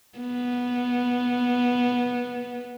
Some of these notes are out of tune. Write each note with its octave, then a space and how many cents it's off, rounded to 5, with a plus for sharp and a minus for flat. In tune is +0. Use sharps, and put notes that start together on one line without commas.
B3 -10